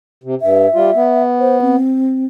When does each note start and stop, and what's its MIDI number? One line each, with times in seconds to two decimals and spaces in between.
0.24 0.35 48
0.42 0.67 43
0.42 1.23 76
0.75 0.90 55
0.75 0.90 65
0.95 1.76 59
1.40 1.60 72
1.62 2.26 60